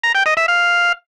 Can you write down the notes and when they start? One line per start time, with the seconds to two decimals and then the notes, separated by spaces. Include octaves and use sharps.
0.03 A#5
0.15 G5
0.26 D#5
0.37 E5
0.48 F5